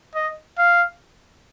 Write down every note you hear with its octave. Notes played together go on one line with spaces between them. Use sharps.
D#5
F5